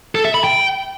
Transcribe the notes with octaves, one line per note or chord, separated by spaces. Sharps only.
A4
E5
B5
G5